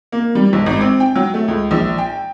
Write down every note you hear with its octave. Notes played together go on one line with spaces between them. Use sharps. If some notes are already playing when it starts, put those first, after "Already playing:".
A#3
G3
B1
G#1
C4
G5
F#3
A3
C#2
A#1
G5